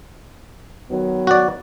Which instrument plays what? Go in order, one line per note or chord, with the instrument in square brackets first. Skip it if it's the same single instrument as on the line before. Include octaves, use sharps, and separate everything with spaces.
[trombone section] D#3 F#3 B3
[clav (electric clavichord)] F#4 D5